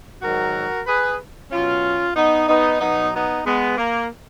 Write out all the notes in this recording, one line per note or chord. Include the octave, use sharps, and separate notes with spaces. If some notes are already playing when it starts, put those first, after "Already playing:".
G#2 D#3 F#3 F#4 A#4
G#4 B4
B2 F#3 C#4 F4
B3 D#4
B3 D#4
B2 F#3 B3 D#4
B3 D#4
G#3 B3
A#3